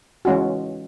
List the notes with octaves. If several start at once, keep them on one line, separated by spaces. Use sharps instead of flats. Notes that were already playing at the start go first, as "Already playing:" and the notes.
E3 G#3 C#4 F4 F#4